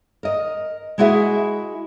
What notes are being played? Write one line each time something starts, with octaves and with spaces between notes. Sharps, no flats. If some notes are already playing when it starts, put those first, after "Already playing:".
A#4 D#5
G#3 E4 F#4 G#4 E5